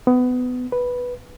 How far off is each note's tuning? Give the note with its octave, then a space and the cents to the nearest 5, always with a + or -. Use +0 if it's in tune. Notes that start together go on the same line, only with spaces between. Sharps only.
B3 +20
B4 -5